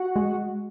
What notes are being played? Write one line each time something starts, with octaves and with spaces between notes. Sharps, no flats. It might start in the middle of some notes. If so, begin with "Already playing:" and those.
Already playing: F#4 F#5
G#3